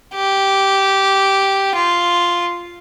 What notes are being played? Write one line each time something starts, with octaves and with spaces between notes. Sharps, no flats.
G4
F4